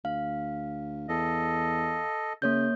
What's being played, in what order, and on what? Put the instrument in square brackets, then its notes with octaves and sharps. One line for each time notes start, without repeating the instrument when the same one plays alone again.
[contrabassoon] D2 [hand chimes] F5
[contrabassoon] E2 [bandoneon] A4 D#5
[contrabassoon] C#3 [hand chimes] A#3 C#5 G6